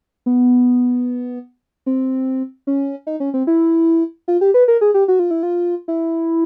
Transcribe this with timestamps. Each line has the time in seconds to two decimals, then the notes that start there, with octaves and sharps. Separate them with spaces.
0.26 B3
1.86 C4
2.67 C#4
3.07 D#4
3.20 C#4
3.34 C4
3.47 E4
4.28 F4
4.41 G4
4.54 B4
4.68 A#4
4.81 G#4
4.94 G4
5.08 F#4
5.19 F4
5.31 E4
5.43 F4
5.88 E4